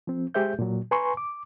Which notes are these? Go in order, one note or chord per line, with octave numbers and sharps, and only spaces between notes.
F3 C4
G#3 G4 G#4 C5 E5 G6
A#2 F#3
B4 G#5 A#5 C6 C#6
D6